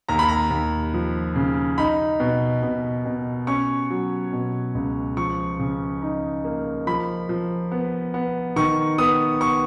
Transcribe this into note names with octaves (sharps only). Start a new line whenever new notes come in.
D#2 A#5
B5
A#5
D#2
F3
C#3
D#4 B5
B2
B2
B2
C#4 C#6
F#3
B2
C#2
F3 C#6
C#3
D#4
A#3
F3 B5
F3
B3
B3
D#3 C#6
B3 D#6
B3 C#6